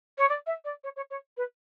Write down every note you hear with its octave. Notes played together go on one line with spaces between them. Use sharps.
C#5
D5
E5
D5
C#5
C#5
C#5
B4